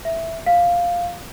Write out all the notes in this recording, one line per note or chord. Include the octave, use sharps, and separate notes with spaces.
E5
F5